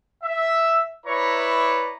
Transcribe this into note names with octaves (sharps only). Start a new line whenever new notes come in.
E5
E4 B4 C#5 D5 A#5